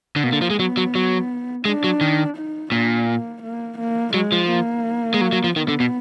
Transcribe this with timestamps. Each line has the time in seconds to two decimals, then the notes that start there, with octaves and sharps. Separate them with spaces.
0.16 D3
0.24 B2 A#3
0.33 D3
0.42 F3
0.50 G#3
0.59 F#3 B3
0.77 F#3
0.95 F#3
1.65 G#3 D4
1.84 F#3
2.01 D#3
2.37 D#4
2.72 A#2 D4
3.08 A#3
3.43 A#3
3.79 A#3
4.14 F#3 G#3
4.32 F3
4.50 A#3
5.14 G#3
5.21 F#3
5.32 F#3
5.44 F3
5.56 D#3 B3
5.68 D3
5.80 B2